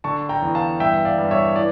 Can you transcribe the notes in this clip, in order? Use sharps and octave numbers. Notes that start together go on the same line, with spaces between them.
D3 A5 C#6
G5 A#5
E2
F5 A5
G2 E5 G5
D5 F5
G2
C#5 E5
E3 D5